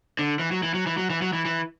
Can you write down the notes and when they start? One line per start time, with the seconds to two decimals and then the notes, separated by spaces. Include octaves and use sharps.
0.19 D3
0.39 E3
0.51 F#3
0.63 E3
0.74 F#3
0.87 E3
0.98 F#3
1.10 E3
1.22 F#3
1.33 E3
1.45 E3